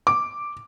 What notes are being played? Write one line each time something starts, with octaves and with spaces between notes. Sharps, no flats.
D6